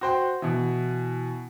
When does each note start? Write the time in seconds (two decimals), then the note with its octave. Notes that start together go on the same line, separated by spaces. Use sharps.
0.01 F#4 C5 G5
0.42 B2 E3